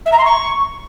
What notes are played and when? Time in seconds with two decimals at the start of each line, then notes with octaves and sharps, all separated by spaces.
0.05 E5
0.12 A#5
0.18 C6
0.24 C#6